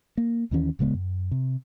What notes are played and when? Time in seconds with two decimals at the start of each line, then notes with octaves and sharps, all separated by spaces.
0.17 A#3
0.51 D#2 D#3 E3 C#4
0.79 D1 C#3 G#3 B3
0.94 F#2
1.31 C3